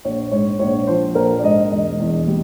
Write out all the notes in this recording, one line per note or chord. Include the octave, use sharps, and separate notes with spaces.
A#1 C#5
G#2 C#5
A#1 C#5
F3 C5
A#1 A#4
D5
G#2 D#5
E1 D#5
E2
G3